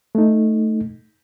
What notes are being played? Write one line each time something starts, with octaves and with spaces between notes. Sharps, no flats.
A3 D#4